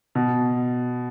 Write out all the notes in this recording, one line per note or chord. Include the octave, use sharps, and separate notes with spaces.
B2